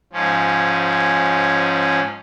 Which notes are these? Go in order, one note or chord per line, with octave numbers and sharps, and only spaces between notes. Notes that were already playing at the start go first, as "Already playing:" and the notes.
G#2 F3 C#4